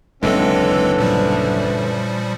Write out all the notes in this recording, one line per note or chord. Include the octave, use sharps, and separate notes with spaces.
F#1 D#2 D3 E3 G#3 C4 C#4 A4
A#2 F3 G3